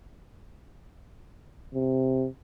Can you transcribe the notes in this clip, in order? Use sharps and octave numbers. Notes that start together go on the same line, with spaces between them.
C3